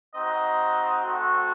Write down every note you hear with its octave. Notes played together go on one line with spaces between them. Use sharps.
C4 D#4 F#4 D#5
A3 C4 F#4